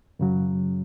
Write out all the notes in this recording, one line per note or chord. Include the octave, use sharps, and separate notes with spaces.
F#2 C#3 F#3